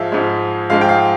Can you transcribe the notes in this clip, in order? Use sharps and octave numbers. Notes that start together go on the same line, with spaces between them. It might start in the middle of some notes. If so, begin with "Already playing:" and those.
Already playing: G#2 F3 G#3 E5 F5
G#2 F3 G#3
G#2 F3 G#3 F5
G5
F5